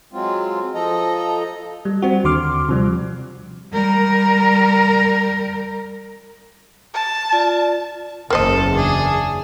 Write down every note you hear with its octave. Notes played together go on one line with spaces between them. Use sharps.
F#3 G#3 C4 F4
F3 A4 D#5 A#5
G3
G3 C4 F#4
D#2 D3 C6 D6 F6
C3 F3 G3
G3 A#4
A5
F4 D5
F#1 E2 A4 A#4 C5 D#5
D4 G#4